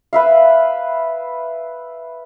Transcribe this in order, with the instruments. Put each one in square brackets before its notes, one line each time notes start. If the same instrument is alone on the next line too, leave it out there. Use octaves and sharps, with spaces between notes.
[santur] B4 E5 F5